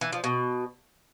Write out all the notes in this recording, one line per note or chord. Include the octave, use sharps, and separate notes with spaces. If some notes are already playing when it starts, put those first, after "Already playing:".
E3
F3
B2